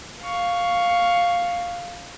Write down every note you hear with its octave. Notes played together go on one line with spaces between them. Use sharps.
F5 C#6